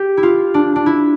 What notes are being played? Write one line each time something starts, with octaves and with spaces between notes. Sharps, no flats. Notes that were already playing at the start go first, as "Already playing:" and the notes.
Already playing: G4
E4
F4
D4
D4
E4